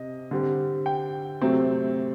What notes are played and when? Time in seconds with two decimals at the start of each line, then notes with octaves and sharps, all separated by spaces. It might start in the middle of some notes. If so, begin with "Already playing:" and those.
Already playing: C3 D#5
0.31 D3 G3 C4
0.86 G5
1.42 C3 F#3 A3 C4